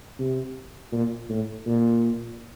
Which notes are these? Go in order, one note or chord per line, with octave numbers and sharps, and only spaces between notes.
C3
A#2
A2
A#2